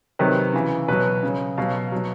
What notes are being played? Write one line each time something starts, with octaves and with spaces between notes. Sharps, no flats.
C3 D#3 F#3 B4
C#3 E3
B2 F#3 B4
C#3 F#3
B2 F#3 F5
B2 F#3